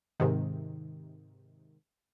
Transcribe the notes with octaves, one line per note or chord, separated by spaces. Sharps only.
G#2 C3 D#3